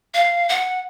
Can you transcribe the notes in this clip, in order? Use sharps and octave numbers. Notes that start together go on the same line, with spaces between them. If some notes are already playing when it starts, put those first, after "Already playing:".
F5
F#5